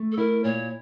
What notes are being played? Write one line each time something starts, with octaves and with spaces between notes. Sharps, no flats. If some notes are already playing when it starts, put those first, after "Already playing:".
Already playing: A3
A4
E4 A#4
A#2 C#5